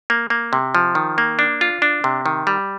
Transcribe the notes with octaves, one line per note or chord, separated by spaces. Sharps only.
A#3
A#3
C3
F3
D#3
A#3
D4
F4
D4
C3
D#3
G3